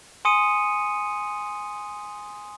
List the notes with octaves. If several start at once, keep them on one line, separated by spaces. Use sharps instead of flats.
G#5 C6 D#6 C#7 D#7